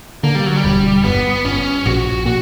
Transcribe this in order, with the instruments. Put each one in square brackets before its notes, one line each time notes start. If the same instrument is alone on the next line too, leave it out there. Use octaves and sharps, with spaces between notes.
[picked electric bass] D3 [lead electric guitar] A#3
[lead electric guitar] G3
F#3
G3
[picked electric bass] E1
[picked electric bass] G1 [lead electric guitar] B3
[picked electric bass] G1 [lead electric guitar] C#4
[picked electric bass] A#1 [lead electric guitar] F#4
[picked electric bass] A#2 [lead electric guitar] F#4